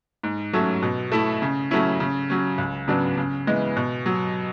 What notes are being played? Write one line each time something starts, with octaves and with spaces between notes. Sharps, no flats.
G#2
F#3 A3 C#4
B2
A3 E4
C#3
F#3 A3 C#4 E4
C#3
F#3 C#4
C#2
C#3 F#3 B3 D4
C#3
E3 G#3 B3
B2
F#3